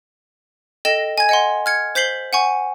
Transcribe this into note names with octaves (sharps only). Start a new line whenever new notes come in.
A4 D#5 G5 A#6 E7
G#5 G#6
D#5 F#5 C6
F6 G#6 C#7
C5 G6 B6 C7 F#7 G7
F#5 G#5 C#6